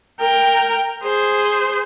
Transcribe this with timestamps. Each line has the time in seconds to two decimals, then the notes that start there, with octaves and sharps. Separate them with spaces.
0.20 A#4 G5
1.03 G#4 C5